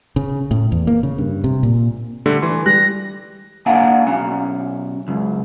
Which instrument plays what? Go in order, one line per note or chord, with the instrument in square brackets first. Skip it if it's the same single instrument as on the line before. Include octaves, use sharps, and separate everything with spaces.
[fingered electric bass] C#3
A2
E2
A#3
C#3
G2
C3
A#2
[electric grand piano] D3 G3 A3
E3 C6
[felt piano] G3 [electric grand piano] F#6 [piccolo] A#6
[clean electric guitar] A#3 D4 F5 F#5 G#5 A#5
B1 C#4 A#5
C#2 F#2